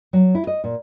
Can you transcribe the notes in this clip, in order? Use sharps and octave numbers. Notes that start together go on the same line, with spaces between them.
F#3
E4
D#5
A#2